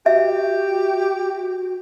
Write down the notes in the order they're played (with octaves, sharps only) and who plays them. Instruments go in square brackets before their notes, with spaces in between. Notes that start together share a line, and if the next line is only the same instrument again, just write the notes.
[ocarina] F#4 [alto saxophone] G4 [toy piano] E5